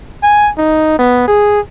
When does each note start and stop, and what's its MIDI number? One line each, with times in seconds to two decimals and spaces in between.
0.23 0.51 80
0.58 0.95 63
0.99 1.28 59
1.28 1.60 68